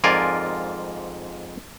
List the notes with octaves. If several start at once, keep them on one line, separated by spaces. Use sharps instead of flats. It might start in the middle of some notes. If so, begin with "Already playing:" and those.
F2 G#2 F4 A#4 D5 G#5